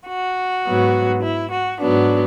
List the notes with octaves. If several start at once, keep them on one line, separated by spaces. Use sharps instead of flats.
F#4
G#2 F#3 B3
E4
F#4
G#2 F#3 B3 D4